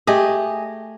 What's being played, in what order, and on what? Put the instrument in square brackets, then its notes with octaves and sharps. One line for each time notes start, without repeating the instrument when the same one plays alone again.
[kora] A3 G4 [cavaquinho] G#4 D#5